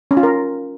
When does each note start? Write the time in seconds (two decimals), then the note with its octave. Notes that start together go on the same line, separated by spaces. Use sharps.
0.11 C#4
0.17 F4
0.23 A#4